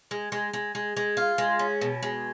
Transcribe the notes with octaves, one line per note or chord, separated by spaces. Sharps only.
G#3
G#3
G#3
G#3
G#3
F4
G#3
C#4
B2
G#3